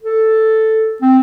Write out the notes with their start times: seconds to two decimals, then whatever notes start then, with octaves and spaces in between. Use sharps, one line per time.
0.03 A4
1.02 C4